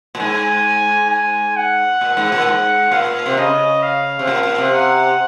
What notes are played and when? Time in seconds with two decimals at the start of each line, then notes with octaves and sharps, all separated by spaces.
0.15 A#2
0.19 G#2 G#5
1.10 G#5
1.57 F#5
2.01 A#2
2.17 G#2
2.32 A#2
2.46 G#2
2.92 A#2 F5
3.26 C3
3.37 C#3 D#5
3.83 F5
4.19 C3
4.27 A#2
4.43 A#2
4.58 C3
4.73 F#5